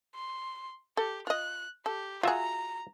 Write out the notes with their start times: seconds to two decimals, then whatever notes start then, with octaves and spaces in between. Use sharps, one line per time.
0.15 C6
0.97 G4 A4
1.27 F4 D#5 F#6
1.86 G4 A4
2.23 F#3 F4 G#4 E5 F#5 A#5